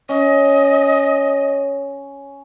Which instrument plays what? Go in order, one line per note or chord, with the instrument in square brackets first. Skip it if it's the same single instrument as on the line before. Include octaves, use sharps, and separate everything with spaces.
[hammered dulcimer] C#4 [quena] D#5